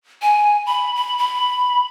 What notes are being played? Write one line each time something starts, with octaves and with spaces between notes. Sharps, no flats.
G#5
B5
B5
B5